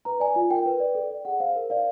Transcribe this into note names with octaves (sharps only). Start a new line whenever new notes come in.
B4 A#5
D5 G#5
F4 G#5
A#4 G5
B4
D5
A4
D5
G#4 F#5
C5 F5
A#4
D5 F5